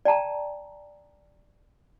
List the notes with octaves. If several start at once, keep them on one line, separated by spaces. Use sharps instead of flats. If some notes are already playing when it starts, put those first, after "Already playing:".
D5 G5 A5 A#5